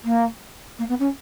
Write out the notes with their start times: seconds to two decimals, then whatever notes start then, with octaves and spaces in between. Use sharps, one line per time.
0.04 A#3
0.78 A#3
0.89 B3
0.99 C#4